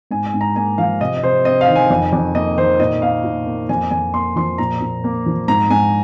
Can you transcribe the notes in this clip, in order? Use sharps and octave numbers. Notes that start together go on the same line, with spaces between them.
G#2 G#5
G#5
G#2
A#5
A#3 G#5
F3 F5
C3 D#5
D#5
C3 C5
C4 D#5
F5
D#3
G#5
F2
F2
A#3 D#5
D#3 C5
A#2 D#5
A#3 F5
A#2
A#3
F2 G#5
F2 G#5
A#3 C6
F3 C6
A#2 A#5
A#2
A#3
F3
G#2 A#5
G#2 G#5